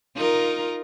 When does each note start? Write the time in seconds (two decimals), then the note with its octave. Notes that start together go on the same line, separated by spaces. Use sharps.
0.15 D#4 F4 A#4